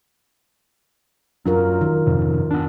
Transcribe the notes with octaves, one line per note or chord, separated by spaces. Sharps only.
F#2 F#3 D4 F4 A#4
D#3
F2 G#2 C3
B3 D4